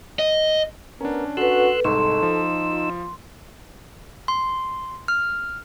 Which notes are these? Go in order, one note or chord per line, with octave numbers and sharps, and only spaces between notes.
D#5
B3 C#4 D4 A#4
F#4 A4 B4 C6 E6 F#6
C2 G#2 D#4 A4 C6 C#6 E6
F3
F4
C6
F6